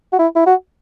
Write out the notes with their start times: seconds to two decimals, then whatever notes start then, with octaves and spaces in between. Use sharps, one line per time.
0.13 F#4
0.19 E4
0.36 E4
0.46 F#4